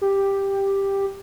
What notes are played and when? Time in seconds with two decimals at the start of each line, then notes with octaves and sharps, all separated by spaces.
0.01 G4